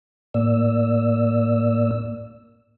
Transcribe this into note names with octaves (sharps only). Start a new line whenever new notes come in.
A2 A#3 D5 E6